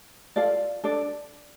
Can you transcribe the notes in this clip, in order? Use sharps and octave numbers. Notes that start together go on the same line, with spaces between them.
F4 A4 D5 F5
D4 A4 D5